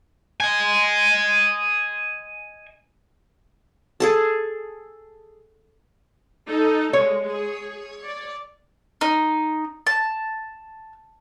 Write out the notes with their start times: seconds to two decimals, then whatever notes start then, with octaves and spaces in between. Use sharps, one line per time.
0.40 D#5 G#5
4.00 G#4 A4 A5
6.48 D#4 A4
6.93 G#3 C#5
7.28 G#4
8.05 D5
9.01 D#4
9.87 A5